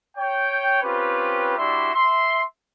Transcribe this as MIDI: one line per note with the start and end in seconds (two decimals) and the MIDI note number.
0.18 0.81 73
0.18 0.81 79
0.82 1.57 60
0.82 1.57 61
0.82 1.57 65
0.82 1.57 67
0.82 1.57 71
1.58 1.93 55
1.58 1.93 62
1.58 1.93 64
1.58 1.93 66
1.58 1.93 76
1.58 1.93 84
1.94 2.43 76
1.94 2.43 84